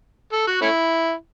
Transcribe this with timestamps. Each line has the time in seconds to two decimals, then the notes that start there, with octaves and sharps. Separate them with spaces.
0.33 A4
0.47 F#4
0.62 A3 C#4 E4